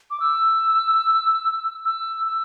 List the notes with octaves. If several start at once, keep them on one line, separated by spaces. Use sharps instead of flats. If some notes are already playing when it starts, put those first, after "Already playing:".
D6
E6
E6
E6